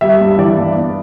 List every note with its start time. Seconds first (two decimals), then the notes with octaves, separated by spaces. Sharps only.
0.01 G3 E5
0.21 G2
0.38 E3 D5
0.57 G2
0.75 B3